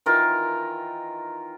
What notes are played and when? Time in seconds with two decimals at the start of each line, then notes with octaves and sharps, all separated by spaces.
0.06 D#3 E3 F4 A#4